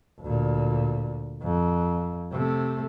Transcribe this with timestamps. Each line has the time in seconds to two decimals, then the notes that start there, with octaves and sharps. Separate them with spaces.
0.21 D2 A#2
1.43 F2
2.32 C3 A3